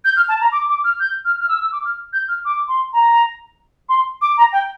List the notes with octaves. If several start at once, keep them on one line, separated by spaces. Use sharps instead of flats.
G6
F6
A5
A#5
D6
D6
F6
G6
F6
F6
E6
E6
D6
F6
G6
F6
D6
C6
A#5
C6
D6
A#5
G5